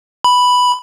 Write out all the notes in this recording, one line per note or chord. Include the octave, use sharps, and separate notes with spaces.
B5